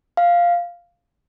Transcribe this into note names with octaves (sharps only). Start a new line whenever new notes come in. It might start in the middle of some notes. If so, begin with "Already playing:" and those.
F5